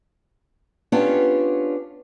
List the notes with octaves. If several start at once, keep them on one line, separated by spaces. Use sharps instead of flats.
B3 C#4 D4 F4 G4 C#5